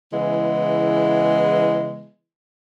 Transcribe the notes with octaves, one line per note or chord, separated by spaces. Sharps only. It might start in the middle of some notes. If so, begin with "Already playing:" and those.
C#3 E3 G#3 B3 E4